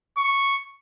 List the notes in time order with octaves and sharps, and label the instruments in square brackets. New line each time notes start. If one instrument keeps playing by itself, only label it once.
[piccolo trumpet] C#6